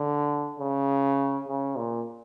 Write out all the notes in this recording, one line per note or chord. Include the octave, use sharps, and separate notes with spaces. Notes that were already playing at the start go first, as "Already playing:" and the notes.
Already playing: D3
C#3
C#3
A#2